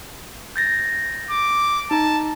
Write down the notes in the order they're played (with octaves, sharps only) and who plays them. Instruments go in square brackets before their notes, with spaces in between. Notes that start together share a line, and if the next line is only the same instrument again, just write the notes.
[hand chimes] G6 A6 A#6
[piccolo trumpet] D6
[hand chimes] D#4 A#5 [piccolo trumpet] A5